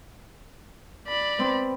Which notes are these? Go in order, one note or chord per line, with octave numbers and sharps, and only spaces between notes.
D5 B5
B3 C4